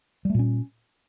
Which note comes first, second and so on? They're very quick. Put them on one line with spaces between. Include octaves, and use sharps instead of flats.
G3 A3 A#2 C#4